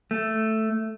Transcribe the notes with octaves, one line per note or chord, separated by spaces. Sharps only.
A3